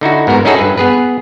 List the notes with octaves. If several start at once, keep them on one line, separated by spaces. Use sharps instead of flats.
D3 D#4 E4 F#4
G#2 B3 F#4 A#4
C#4 D#4 E4 F#4 G#4 A4
G2 B4
B3 G#4 B4